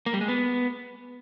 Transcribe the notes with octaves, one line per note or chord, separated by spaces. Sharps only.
A#3
G3
G#3
B3